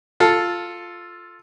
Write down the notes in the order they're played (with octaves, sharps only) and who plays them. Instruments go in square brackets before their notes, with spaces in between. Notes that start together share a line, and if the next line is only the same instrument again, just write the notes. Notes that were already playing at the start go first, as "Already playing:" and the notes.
[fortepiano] F4 A4